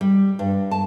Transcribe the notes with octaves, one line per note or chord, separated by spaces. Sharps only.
G3
G2
A5